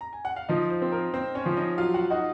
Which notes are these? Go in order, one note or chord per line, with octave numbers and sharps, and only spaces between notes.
A#5
G#5
F#5
F5
F3 D#4 D#5
C5
C4
A#4
C4 C5
C#4 C#5
F3
D#4 D#5
F#3 F4 F5
F#4 F#5
D#4 F#4 F#5